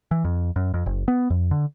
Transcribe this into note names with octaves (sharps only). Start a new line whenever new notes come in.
E3
F2
F#2
F2
F#1
B3
F2
D3